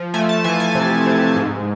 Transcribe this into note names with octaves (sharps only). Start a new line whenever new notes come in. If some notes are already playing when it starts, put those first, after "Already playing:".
Already playing: F3
A3 G#5
A5
E3 G#5
G#5
C3
C3
G#2